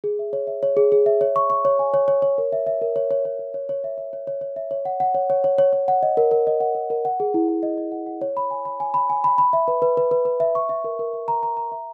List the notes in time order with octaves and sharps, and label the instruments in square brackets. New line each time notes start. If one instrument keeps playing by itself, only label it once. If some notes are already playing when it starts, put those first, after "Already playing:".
[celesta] G#4
E5
C#5
E5
C#5
G#4
G#4
E5
C#5
C#6
C#6
C#5
G#5
C#5
C#5
C#5
A#4
E5
E5
A#4
C#5
C#5
C#5
A#4
C#5
C#5
E5
E5
C#5
C#5
C#5
E5
C#5
F#5
F#5
C#5
C#5
C#5
C#5
C#5
F#5
D#5
A#4
A#4
D#5
F#5
A#4
A#4
F#5
G#4
E4
F#5
D#5
D#5
F#5
F#5
C#5
B5
G#5
B5
G#5
B5
G#5
B5
B5
E5
B4
B4
B4
B4
B4
E5
C#6
E5
A#4
A#4
E5
A#5
A#5
A#5
E5